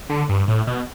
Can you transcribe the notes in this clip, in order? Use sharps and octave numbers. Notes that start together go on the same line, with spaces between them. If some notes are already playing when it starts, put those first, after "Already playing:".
D3
G2
A2
B2